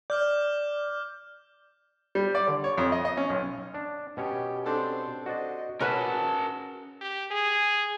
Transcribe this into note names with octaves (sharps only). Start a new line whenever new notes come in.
D5 D6 F6 G6
G3
D5
D3
C#5
F2
D#5
D#5
C#4
B1
D4
B2 C#4 G4 C#5
C4 D4 A4 C5
F#4 C5 D5 D#5
C#4 F#4 A#4 B4 A5
G4
G#4